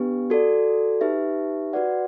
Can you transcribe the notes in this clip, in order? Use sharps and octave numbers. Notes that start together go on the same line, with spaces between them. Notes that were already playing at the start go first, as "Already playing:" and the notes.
Already playing: B3 D4 G4 B4
F#4 A4 D5
D#4 G4 B4 E5
F#4 B4 D5 F#5